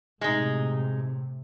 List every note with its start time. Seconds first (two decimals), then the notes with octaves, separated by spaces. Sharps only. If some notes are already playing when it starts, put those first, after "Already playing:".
0.21 A2 C3 G#3 D#4